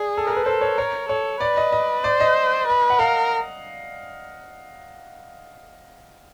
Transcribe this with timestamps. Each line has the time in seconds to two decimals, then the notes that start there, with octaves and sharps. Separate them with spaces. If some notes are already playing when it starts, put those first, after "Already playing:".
Already playing: G#4 D5
0.17 A4
0.27 A#4
0.36 B4
0.46 A4 C5
0.61 C#5
0.78 A#4 C#5
1.09 A4 C#5
1.40 B4 D5
1.57 D#5
1.72 D#5
2.04 C5 D5
2.20 D#5
2.67 B4
2.90 F#5
2.99 A#4 F5